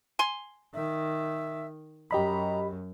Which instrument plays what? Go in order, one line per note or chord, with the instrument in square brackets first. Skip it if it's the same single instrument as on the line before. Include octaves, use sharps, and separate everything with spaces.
[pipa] G#5 C6
[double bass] D#3 [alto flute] E5
[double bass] F#2 [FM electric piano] G4 D#5 B5 [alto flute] A#5